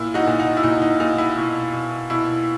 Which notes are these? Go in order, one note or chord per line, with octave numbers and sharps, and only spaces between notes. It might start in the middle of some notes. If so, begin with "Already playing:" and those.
Already playing: A#2 E4
D#4 F#4
A#2
D#4
E4
A#2 D#4
D#4
A#2 D#4
E4
B2
B2
B2 E4